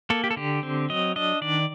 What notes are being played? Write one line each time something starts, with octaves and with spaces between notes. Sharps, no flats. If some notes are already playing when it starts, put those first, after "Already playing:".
A#3 A4
G4
A4
D3 G4
C4
F#3 D#5
D4 D#5
D#3 D5